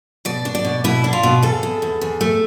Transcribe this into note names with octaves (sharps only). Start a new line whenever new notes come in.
B2 D5
D4
D5
B2
B2 E4
D4
F4
B2
E2 A4
E2
E2
E2
A3